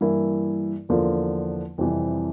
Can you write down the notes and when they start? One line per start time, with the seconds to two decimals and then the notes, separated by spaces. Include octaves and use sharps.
0.01 G2 E3 A#3 E4 A#4
0.89 E2 D3 F3 A#3 F4
1.78 F2 C3 E3 G3